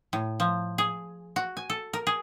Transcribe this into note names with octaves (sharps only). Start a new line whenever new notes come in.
A2
F3
G#4
F#4
G#5
A4
A#4
G#4